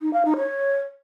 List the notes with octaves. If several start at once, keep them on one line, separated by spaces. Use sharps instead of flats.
D#4
F5
D#4
C#5